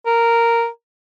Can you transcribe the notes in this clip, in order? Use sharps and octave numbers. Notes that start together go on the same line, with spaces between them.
A#4